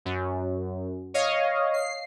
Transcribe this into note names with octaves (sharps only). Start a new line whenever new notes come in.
F#2
C#5 D#5 F5
C7